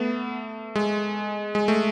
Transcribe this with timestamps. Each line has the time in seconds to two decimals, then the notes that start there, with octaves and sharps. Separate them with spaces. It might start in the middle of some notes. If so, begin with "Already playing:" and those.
Already playing: A3 B3
0.76 G#3
1.55 G#3
1.68 A3